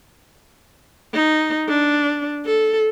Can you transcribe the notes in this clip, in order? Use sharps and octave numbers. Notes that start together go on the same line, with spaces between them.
D#4
D4
A4